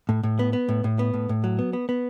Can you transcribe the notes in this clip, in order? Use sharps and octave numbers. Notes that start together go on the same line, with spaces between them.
A2
A2
B3
B3
A2
A2
B3
A2
A2
F#3
B3
B3
B3